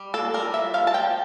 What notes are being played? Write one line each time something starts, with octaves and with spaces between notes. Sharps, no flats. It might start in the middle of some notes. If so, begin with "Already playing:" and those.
Already playing: G3
A#3 A4
G3 A#4
F3 E5
F3 F5
A5
F3 G5